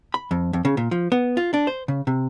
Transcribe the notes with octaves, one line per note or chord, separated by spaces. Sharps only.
B5
F2
F2
C#3
A#2
F3
B3
F4
D4
C5
C#3
C3